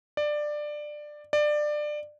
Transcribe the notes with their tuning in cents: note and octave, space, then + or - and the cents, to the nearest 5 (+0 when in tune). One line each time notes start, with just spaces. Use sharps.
D5 +15
D5 +20